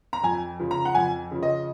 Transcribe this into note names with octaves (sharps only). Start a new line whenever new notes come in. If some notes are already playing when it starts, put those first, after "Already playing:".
A#5
F2 G#5
C#3 F3
A#5
F#5
F2 G#5
C#3 F3
D#5